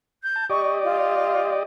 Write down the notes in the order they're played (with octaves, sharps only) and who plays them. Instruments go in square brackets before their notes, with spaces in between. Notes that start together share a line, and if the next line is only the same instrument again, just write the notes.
[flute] G6
[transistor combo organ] A5
[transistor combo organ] G4 D5 D#5 [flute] C#6
[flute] F4